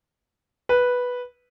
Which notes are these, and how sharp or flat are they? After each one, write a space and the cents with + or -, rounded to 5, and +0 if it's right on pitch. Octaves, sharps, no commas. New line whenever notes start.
B4 -5